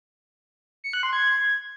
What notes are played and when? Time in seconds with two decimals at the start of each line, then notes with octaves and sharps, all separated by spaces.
0.84 C#7
0.93 F#6
1.03 C6
1.13 G#6